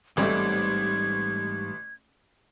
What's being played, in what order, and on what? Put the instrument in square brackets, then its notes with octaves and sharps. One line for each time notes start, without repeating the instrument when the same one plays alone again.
[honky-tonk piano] A1 A3 [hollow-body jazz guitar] G#2 G3 C4 [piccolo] G#6